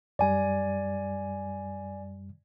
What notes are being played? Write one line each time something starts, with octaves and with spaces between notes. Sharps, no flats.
F#2 G3 D5 G#5